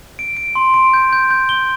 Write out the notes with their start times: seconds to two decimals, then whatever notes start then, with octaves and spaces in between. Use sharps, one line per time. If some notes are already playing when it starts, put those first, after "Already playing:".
0.19 D7
0.37 D7
0.55 C6
0.74 D7
0.94 G6
1.13 G6
1.31 G6
1.49 G7